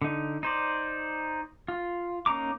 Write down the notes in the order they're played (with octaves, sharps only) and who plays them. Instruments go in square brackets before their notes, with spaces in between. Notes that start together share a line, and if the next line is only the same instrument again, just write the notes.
[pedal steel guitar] D3 D#4
D#4 C5 D5
F4
A#3 C#4 D#4 A#5 D6